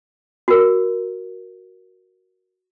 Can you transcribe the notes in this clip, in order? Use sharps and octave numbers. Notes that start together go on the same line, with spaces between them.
F#4 A#4